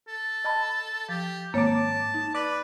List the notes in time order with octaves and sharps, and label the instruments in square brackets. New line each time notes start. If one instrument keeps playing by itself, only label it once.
[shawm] A4
[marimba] D#5 A5 B5
[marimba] F3 [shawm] G4
[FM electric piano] G#1 D6 [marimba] A#3 C#5 [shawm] A5
[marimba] D#4
[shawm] B4 [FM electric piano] D5